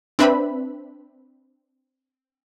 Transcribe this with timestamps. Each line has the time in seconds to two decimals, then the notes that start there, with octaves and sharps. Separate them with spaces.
0.19 C4 D4 B4 E5 B5